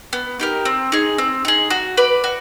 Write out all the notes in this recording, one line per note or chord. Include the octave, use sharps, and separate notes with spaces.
B3
D#4 G4 A#4
C4
D#4 G#4
C4
D#4 G#4
F#4
B4 D5
F#4